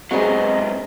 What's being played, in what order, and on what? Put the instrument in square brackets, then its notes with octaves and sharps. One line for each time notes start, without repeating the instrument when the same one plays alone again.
[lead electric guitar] G#2 F#3 [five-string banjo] B3 F#4 [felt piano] C4 G#4 C5 [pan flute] D#5